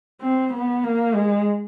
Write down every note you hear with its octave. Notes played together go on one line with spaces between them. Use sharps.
C4
B3
A#3
G#3